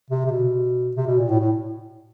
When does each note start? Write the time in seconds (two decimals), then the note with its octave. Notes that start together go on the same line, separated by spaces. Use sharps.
0.11 C3
0.26 C3
0.32 B2
0.96 C3
1.07 B2
1.18 A#2
1.29 A2
1.40 A2